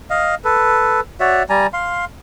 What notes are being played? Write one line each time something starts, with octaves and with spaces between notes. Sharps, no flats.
D#5 F5
A4 B4
F#4 C#5 D5 E5
G3 D5 G#5 A#5
F5 C6